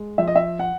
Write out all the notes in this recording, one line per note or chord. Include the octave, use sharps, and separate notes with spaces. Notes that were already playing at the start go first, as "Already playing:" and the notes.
Already playing: G#3
F3 E5
D#5
E5
F#5